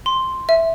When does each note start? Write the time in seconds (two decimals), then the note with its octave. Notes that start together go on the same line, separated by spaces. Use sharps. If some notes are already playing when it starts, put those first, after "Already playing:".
0.06 C6
0.49 E5